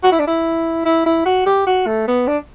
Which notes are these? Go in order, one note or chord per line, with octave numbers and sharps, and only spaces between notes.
F#4
E4
D4
E4
E4
E4
F#4
G4
F#4
A3
B3
D4